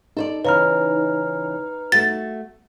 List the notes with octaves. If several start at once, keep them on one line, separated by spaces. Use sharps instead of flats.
D#4 A4 C5 D5
C#3 E3 B4 A#5 F6
A3 F#4 A6